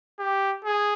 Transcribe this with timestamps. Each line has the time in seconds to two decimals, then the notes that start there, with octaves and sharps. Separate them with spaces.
0.19 G4
0.65 G#4